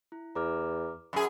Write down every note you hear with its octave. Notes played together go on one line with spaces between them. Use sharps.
E4
E2 A#5 D6 F6
F#2 G#4 B5